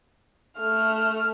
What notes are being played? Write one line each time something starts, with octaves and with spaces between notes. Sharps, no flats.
A3 F6